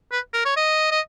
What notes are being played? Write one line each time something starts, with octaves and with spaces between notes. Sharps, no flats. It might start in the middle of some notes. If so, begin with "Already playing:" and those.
B4
A#4
C#5
D#5
D#5